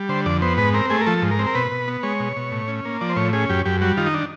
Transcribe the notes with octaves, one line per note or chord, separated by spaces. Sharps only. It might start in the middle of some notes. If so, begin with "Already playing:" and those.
Already playing: G3
D3 C5
F2 D5
B3 C5
G#2 B4
C4 A#4
A3 G#4
A#4
F3 A4
G#2
A#4
C4
A#4
B2 B4
B2
B3
G#3 C#5
B2
B2
A2
C#4
A#3
F3 D5
C5
A2 C#5
C#4 G#4
F#2 G4
F#2 G4
G3 F#4
D#3 F4
D#4
D4